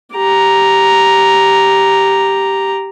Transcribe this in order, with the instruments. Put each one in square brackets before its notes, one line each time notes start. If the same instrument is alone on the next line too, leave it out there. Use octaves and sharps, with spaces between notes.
[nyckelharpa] G4 A#5